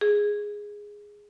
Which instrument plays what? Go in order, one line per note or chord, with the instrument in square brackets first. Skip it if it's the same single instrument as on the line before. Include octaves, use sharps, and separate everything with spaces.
[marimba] G#4